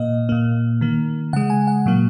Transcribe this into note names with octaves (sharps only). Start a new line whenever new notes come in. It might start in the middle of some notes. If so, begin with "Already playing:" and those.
Already playing: A#2 A#3 D#5
A#2 A#3
D#3 A#3
C#3 G#3 F#5
G#5
F#5
A#2 F#3 A#3